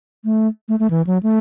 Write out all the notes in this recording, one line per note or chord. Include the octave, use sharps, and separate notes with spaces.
A3
A3
A3
E3
F#3
A3